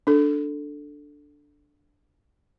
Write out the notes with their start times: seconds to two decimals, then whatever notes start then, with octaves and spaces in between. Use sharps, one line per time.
0.07 D4 A4